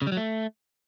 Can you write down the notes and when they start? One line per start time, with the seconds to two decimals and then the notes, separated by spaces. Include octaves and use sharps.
0.02 C#3
0.07 G3
0.12 F#3
0.17 A3